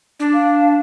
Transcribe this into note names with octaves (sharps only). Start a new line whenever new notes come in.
D4
F5